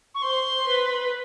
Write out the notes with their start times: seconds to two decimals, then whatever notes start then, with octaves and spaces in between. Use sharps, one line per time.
0.15 C#6
0.22 C5 C6
0.67 B4